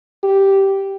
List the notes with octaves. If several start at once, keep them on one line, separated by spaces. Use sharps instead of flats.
G4